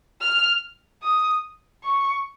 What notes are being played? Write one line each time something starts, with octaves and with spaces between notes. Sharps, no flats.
F6
D#6
C#6